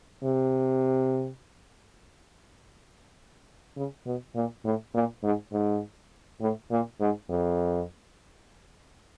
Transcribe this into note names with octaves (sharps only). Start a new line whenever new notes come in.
C3
C#3
B2
A#2
A2
A#2
G#2
G#2
A2
A#2
G#2
F2